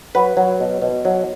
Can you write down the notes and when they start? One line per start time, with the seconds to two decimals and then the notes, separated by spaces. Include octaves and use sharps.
0.15 F#3 B4
0.37 F#3
0.60 B2
0.82 B2
1.05 F#3